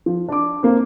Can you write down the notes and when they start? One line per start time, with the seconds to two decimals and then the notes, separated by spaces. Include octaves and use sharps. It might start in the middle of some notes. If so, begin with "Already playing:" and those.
0.06 F3
0.29 D4 D6
0.63 A#3 C4